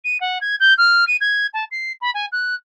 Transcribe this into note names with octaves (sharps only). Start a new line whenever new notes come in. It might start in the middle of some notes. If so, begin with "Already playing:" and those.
D#7
F#5
G#6
G6
F6
D#7
G#6
A5
C7
B5
G#5
F#6